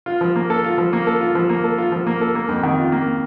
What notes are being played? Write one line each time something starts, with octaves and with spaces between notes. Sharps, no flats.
F4
F3
A#3
A4
F4
F3
A#3
A4
F4
F3
A#3
A4
F4
F3
A#3
A4
A#3
F2
D#3
F4
A#3